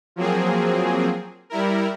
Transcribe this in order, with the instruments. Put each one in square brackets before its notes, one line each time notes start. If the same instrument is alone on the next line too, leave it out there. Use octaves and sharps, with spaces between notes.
[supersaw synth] F3 F#3 A#3 C4 G#4
G3 E4 A#4